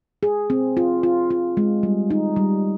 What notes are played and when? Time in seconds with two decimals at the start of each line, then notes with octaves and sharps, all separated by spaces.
0.23 G#4
0.50 C4
0.77 F4
1.03 F4
1.30 F4
1.57 G#3
1.83 G3
2.11 D#4
2.36 G3